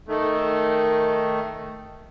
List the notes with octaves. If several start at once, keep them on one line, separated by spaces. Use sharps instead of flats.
D#3 A3